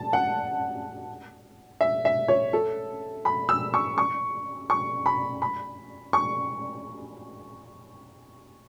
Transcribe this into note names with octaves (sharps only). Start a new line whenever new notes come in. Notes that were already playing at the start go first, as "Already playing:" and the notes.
Already playing: A5
F#5
E5
E5
C#5
A4
B5
E6
C#6
C#6
C#6
B5
B5
C#6